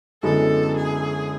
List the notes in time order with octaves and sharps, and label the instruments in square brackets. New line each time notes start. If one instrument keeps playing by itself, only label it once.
[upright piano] F#2 D3 G#3 B3 E4 [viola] A4
[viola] G#4